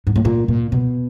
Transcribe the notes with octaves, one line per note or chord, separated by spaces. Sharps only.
G#2
A2
A#2
A#2
B2